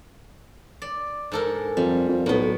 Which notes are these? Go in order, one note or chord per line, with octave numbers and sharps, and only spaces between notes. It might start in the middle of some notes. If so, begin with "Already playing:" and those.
D5
G#2 A4 A#4
F2 G3
F2
B1 A2 B3